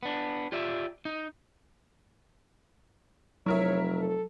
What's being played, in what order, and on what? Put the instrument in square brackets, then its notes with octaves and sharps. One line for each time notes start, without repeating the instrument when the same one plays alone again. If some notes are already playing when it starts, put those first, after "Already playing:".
[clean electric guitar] B3 D4
F4 G4 D5 E5
D#4
[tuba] F1 [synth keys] F#3 [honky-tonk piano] E4 A#4 E5 [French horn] C#5
[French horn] A4